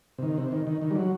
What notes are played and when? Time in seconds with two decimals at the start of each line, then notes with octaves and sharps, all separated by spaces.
0.18 C3
0.23 D#3
0.38 C3
0.52 D#3
0.67 D#3
0.82 D#3
0.91 G3
0.96 F#3